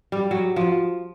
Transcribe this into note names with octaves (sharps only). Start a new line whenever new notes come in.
G3
F#3
F3